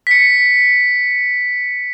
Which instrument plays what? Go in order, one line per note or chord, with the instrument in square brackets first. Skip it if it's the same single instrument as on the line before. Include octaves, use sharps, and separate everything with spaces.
[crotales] B6 C#7